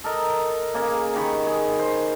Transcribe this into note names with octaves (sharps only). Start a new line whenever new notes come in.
A4 A#4 D#5
C#3 A#3
D#3 G4 B5 C#6
G#4
C5